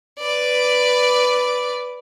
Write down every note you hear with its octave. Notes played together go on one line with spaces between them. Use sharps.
B4 D5